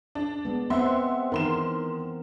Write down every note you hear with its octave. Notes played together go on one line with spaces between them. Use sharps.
D4
G#3 B3
B3 C4 E5 F#5 C6
D#3 E3 A#4 C6 E7